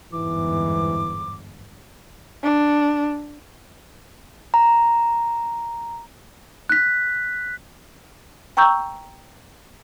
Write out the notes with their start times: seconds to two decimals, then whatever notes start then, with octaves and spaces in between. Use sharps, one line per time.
0.12 G1 E2 G#2 E3 D6
2.43 D4
4.54 A#5
6.69 F#6 B6
8.57 G5 A#5 C#6 E6 G6